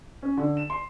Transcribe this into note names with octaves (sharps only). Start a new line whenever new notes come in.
C#4
D3
E7
C6